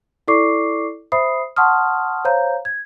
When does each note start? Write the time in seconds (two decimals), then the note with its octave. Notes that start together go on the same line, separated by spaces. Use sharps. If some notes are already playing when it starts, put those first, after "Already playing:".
0.28 E4 A4 D5 C#6 D6 C7
1.12 C5 E5 B5 D#6 C7
1.56 F#5 A5 C6 C#6 D#6 F6
2.25 C5 C#5 F5 A#5 G6
2.65 G#6